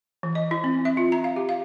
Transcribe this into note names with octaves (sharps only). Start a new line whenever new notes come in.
E3
D#5
E4
C4
E5
F4
A#5
F5
G4
F5